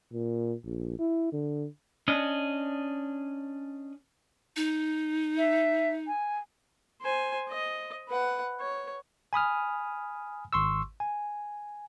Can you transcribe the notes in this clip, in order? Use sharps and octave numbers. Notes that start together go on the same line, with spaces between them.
A#2
A#1
E4
D3
C#4 D4 D#5
D#4
E5
G#5
C5 G#5
D#5
B4 F#5
C#5
G#5 B5 D#6 F6
G#1 C6 C#6 E6
G#5